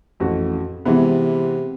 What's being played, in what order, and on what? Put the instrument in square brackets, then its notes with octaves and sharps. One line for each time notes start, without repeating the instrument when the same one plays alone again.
[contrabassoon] A1 [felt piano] F2 F#4
[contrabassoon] C3 [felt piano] E3 G#3 B3